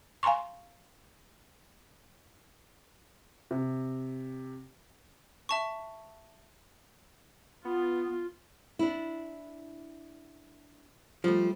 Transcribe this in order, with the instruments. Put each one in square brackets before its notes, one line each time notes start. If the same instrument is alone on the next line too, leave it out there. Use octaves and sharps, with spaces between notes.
[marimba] F5 G#5 A#5 C6 C#6
[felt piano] C3
[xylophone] E5 A5 C#6
[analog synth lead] B3 [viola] F4
[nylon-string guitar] D4 E4
[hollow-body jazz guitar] F3 [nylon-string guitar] G3 A3